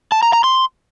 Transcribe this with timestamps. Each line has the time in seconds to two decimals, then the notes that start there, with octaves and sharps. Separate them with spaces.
0.12 A5
0.23 A#5
0.33 A#5
0.44 C6